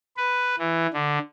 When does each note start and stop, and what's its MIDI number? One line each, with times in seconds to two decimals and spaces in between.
0.17 0.55 71
0.59 0.87 52
0.93 1.18 50